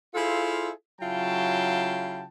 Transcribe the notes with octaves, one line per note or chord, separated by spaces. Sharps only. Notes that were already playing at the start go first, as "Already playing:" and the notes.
E4 F4 G#4 A4 C5 F5
C#3 F#3 E4 F4 G5 A5